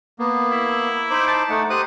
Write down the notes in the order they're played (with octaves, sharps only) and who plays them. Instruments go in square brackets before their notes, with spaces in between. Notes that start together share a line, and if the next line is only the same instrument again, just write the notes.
[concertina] A#3 B3
[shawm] E4
[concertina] D#4 C5 D6
[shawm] A5
[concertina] A3 D#4 F#5
[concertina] G4 C5 F#6 [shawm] D#6